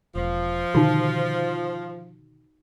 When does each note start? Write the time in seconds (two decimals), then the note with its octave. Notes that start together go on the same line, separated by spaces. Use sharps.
0.15 E1 F3
0.75 B2 D3 D#3 D#4 F#4